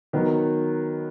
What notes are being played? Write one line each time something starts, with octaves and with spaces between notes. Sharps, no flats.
D#3 F#3 B3